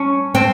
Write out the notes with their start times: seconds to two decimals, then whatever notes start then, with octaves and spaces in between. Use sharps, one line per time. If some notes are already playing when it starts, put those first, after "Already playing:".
Already playing: C#4
0.35 C4